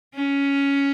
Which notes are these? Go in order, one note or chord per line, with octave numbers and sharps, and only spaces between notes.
C#4